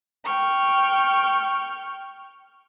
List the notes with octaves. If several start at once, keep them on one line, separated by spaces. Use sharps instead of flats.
G5 C#6 F6